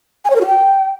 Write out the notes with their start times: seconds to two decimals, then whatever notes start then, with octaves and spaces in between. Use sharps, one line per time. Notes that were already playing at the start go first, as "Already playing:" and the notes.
0.25 G#5
0.30 C#5
0.35 A#4
0.41 F#4
0.46 G5